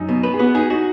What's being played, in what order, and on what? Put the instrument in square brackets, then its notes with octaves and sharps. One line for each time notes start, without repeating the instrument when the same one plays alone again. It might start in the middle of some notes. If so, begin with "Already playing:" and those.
Already playing: [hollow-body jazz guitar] F#2 [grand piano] D#4
[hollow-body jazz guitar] B2
B4
[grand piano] G#4
[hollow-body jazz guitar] B3 [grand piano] F#4
[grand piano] D#4 [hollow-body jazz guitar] G#4
[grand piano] D#4 [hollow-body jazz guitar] F#4